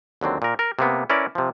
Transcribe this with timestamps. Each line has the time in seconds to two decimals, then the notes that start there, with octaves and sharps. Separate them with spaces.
0.21 D#2 D3 F#3 C4
0.42 A#2 A#4
0.59 A#4
0.79 C3 A#3 B3
1.10 C#4 E4 A#4 B4 D5
1.35 C3 F3